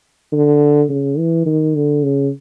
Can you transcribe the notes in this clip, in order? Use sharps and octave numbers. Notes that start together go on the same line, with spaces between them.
D3
C#3
E3
D#3
D3
C#3